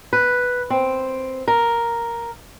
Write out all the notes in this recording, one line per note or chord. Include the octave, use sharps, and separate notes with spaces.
B4
C4
A#4